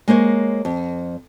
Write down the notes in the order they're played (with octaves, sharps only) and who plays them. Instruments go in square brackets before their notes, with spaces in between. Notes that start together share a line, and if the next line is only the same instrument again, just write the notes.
[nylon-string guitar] G#3 A#3 C5 C#5
F2